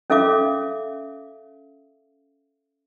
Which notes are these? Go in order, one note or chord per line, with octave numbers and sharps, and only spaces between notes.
C#4 A4 E5 F5 D6